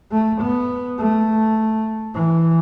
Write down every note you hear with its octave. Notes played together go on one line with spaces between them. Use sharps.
A3
B3
A3
E3